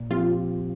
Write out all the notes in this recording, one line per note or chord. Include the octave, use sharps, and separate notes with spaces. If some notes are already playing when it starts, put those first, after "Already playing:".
Already playing: A#2
F3 C4 F4 G4